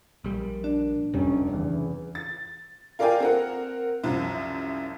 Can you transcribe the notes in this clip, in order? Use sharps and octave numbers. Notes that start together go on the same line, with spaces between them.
A#1 G3 A#3
D4
F1 C3 G3 C#4
E2 C#3 E3
A6
F4 A#4 D5 F5 G5 G#5
C4 A#4 F#5
C2 F#2 F3